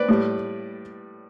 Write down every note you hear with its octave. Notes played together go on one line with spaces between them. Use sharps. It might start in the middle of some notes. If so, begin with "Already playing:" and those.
Already playing: B4 D5
A2 G3